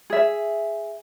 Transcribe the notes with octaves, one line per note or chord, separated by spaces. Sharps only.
G#4 E5